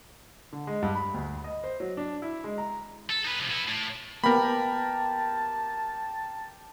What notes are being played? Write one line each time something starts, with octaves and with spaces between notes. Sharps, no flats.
D3
G#3
G2
B5
D2
D#5
C5
F#3
D4
E4
G#3
A#5
A4
D#4 B4
C3 F3
B3 E4
A2
A#3 B3 G4 A#4 A5 B5